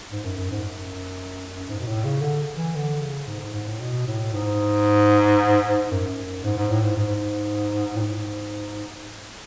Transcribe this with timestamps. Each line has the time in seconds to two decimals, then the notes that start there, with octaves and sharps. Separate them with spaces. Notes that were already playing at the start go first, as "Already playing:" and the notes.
0.11 G#2
0.24 F#2
0.38 F#2
0.51 G#2
0.64 F#2
1.69 G#2
1.80 B2
1.87 A2
2.05 C#3
2.22 D3
2.57 E3
2.75 D3
3.02 C#3
3.27 G#2
3.40 G#2
3.54 G#2
3.67 A2
3.80 B2
4.07 A2
4.33 G#2
5.91 F#2
6.44 G#2
6.57 G#2
6.70 A2
6.83 G#2
6.97 G#2
7.96 A2
8.01 G#2